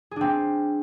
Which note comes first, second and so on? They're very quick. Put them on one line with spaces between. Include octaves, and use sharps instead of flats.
G#4 D4 C4